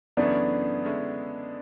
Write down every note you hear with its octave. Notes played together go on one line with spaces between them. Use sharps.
F#2 C#3 E3 A3 B3 C#4 D4
D3 G#3 C#4 E4